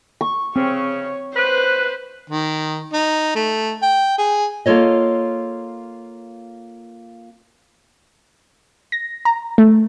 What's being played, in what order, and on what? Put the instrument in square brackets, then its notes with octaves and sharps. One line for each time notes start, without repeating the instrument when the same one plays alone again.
[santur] C#6
[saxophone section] C#3 [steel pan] C4 [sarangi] C#5
[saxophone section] B4 [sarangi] C5
[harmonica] D#3
D#4
A3
G5
G#4
[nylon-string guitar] A#3 F4 A4 C#5 D#5
[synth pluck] A#6
A#5
A3